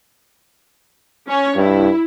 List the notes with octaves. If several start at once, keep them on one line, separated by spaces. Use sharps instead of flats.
C#4 C#5
G2 E4